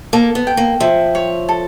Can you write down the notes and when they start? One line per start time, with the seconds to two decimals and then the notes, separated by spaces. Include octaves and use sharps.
0.13 A#3 A4
0.35 B3
0.47 G5
0.57 A#3
0.80 F3 E5
1.15 C#5
1.49 A4